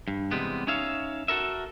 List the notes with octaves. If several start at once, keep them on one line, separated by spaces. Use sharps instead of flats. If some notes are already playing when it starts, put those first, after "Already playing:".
G2
E2 C3 G3 G#3 B3
C#4 D#4 C#5 E5 F5
F#4 A4 A#4 E5